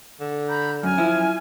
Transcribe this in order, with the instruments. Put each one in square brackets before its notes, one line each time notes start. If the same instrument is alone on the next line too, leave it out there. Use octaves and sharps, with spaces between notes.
[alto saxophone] D3
[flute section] A#5 B5 G6
[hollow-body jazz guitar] F#2 [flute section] G#5 F6
[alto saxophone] F3 [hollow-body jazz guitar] E4